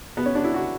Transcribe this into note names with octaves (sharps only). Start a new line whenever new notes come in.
B3
C#4
D4
E4
F#4